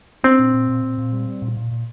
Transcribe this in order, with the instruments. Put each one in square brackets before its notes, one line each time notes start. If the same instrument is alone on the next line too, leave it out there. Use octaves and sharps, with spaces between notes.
[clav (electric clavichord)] C4 [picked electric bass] D4
[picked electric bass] A#2
A#2
A#2
A#2
A#2
G3
G3
A#2
A#2
A#2